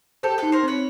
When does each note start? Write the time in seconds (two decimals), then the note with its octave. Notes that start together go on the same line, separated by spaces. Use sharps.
0.23 G4 A4 C5
0.38 D#4 A4 B4
0.52 A#4 C5
0.63 C4 B4 C#5